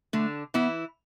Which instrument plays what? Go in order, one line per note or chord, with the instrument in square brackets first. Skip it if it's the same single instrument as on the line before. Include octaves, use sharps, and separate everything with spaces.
[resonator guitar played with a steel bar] D3 D4 [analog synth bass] A3
[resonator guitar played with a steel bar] E3 E4 [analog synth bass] B3